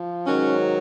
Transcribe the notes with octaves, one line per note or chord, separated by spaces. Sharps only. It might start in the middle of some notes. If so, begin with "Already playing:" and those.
Already playing: F3
G#2 D#3 F#3 C#4